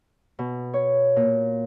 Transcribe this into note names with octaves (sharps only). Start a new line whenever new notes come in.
B2
C#5
A#2